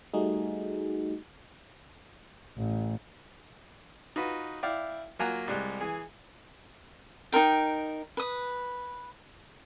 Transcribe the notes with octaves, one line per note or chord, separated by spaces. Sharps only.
G3 A3 D#4 F#4 G#4
A1
D#4 F4 F#4 B4
E4 D5 F5 G5
F#3 A#3 F4 F#5 G#5 A#5
C2 G3 G#3 F#6
E3 G#4
D#4 F4 A#4 G5
B4 D#6